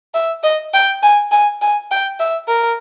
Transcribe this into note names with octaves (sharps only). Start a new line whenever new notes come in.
E5
D#5
G5
G#5
G#5
G#5
G5
E5
A#4